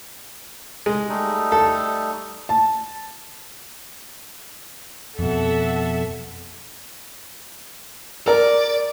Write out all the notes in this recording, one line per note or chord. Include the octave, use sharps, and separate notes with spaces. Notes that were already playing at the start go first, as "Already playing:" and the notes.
G#3
G3 A3 D#4
A4
A5
F2 B2 A4 E5 F#5
A#4 D5